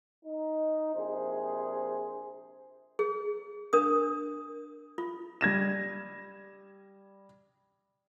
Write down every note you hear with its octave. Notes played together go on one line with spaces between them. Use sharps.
D#4
A#1 C3 G#4 C5
G#4
D4 A#4 D#6
F4
G3 G#6 A#6 E7